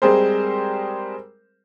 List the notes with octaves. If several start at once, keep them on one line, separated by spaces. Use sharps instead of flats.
G3 G#3 C4 G#4 A#4 C5